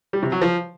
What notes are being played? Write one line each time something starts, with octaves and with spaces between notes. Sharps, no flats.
G3
C3
F#3
F3